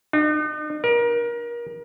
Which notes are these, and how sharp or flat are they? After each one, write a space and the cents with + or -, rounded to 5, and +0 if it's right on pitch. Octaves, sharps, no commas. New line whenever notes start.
D#4 -45
A#4 +30